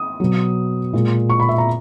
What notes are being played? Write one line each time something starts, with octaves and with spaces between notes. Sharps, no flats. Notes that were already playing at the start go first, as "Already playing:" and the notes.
Already playing: D#6
B2 F#3
A#2 G#3
C#6
B5
E5
A#5